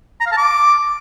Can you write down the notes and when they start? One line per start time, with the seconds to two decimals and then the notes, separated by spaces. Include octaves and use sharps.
0.21 A#5
0.26 F5
0.32 A5
0.38 D6